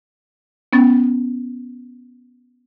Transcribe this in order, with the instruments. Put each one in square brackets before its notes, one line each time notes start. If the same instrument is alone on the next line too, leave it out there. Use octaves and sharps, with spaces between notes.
[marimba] B3 C#4 A6